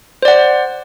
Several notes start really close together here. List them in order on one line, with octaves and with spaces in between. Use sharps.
C5 D5 F#5